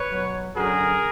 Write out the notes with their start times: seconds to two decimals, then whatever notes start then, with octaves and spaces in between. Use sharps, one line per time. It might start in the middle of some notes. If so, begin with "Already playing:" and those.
Already playing: B4 C#5
0.09 B2 F#3
0.55 F#2 D3 F#3 G#4 A#4